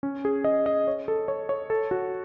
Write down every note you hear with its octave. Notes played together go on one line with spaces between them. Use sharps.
C#4
G#4
D#5
D#5
C#5
A4
C#5
C#5
A4
F#4